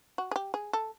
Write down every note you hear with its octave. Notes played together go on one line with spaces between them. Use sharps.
F#4
G#4
G4
G#4
A4